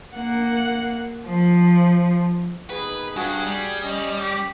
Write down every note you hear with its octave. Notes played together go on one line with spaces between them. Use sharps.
A#3 F#5
F3
D#2 B3 G#4 B4
G2 F#4 G#4
G3
C#4 D#5
G4